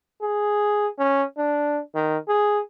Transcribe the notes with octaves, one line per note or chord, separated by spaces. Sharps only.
G#4
C#4
D4
D#3
G#4